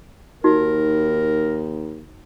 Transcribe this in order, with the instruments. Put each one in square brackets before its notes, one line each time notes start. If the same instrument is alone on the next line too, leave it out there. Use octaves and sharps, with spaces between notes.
[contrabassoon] D#2 [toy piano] D#4 F#4 [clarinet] A#4